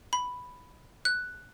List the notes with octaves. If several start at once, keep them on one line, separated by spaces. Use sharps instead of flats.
B5
F#6